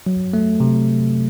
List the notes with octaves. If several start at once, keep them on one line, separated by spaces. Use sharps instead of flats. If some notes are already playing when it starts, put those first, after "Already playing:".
F#3
A3
C3